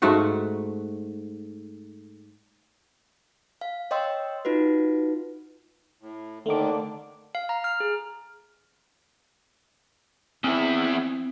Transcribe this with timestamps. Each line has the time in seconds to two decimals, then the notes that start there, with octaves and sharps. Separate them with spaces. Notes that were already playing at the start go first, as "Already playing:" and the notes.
0.02 G#2 A3 F#4 F#5
3.61 F5
3.91 C#5 D#5 G5 C6 E6
4.45 D#4 F4 F#4 B4
6.02 A2
6.46 D#2 D3 D#3 A3 D6
7.35 F5
7.49 A#5
7.64 F6
7.80 G#4
10.44 E2 C4 E4